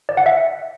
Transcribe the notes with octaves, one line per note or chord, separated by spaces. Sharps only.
D5
F#5
E5